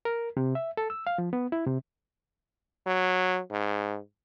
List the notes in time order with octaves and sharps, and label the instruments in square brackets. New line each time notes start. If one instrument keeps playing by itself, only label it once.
[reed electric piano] A#4
C3
E5
A4
E6
F5
F3
B3
E4
C3
[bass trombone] F#3
G#2